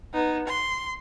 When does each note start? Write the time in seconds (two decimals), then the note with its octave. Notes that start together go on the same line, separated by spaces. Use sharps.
0.14 B3 D#4
0.48 C6